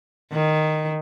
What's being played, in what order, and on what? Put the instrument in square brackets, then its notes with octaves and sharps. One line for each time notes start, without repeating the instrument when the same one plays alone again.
[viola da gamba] D#3